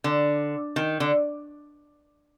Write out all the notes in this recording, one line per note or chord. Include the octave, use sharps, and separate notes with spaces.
D3
D#3
D3